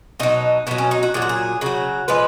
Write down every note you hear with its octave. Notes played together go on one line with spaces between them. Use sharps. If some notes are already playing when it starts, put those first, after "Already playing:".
B2 F#3 D#4
B2 F#3 B3
C#4
D#4
F#4
A#2 F#3 G#4
F#4
G#4
C#3 F#3 F#4
A#2 F3 G#3 B4